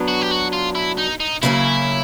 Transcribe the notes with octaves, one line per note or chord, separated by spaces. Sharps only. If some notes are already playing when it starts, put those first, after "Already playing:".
Already playing: F#3 B3 D4
F#4
G4
F#4
F4
E4
D#4
D#4
C#3 F#3 A#3 C#4 E4